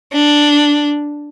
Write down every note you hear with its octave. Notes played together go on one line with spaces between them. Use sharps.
D4